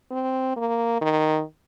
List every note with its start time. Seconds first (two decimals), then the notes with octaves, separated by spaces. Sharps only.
0.11 C4
0.57 A#3
1.01 D#3